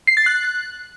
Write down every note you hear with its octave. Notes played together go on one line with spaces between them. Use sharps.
C7
A6
F#6